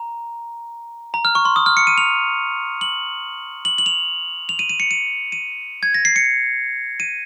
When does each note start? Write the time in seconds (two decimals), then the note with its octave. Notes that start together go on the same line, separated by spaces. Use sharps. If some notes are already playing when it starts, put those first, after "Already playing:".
Already playing: A#5
1.14 A#5
1.25 F6
1.35 C#6
1.45 C6
1.56 D#6
1.66 F6
1.77 C#7
1.87 D#7
1.98 F7
2.81 F#7
3.65 F#7
3.78 F#7
3.86 F7
4.49 F7
4.59 D#7
4.69 D#7
4.80 C#7
4.91 D#7
5.32 D#7
5.83 G#6
5.94 A#6
6.05 C7
6.16 C#7
7.00 D#7